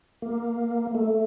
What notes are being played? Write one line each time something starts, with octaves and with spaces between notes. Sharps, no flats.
A#3
A3